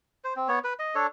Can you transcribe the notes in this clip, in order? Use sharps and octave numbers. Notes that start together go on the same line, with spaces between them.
C5
C4
B3 C#5
B4
D#5
D4 A4 C#5